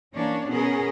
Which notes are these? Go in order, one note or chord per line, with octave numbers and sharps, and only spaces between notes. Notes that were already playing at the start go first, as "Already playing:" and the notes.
E3 A#3 C#4 D4 C#5
B2 B3 C#4 G#4 A#4